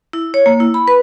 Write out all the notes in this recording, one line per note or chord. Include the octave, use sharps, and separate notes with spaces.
E4
C#5
A#3
E4
B5
B4